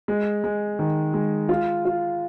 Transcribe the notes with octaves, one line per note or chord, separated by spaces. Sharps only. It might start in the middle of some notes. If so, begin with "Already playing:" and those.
G#3
G#3
D#3
G#3
F4
F4